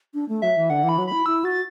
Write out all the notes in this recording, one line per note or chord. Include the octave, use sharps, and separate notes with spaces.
D4
A3
F#3 E5
E3
D3 F#5
E3
B5
F#3
E4 B5
E4 E6
F#4 A6